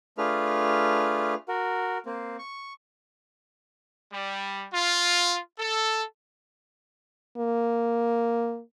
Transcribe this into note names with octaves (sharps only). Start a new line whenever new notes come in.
A3 D4 F4 G#4 B4 F6
F#4 A#4
A#3 C4
C#6
G3
F4
A4
A#3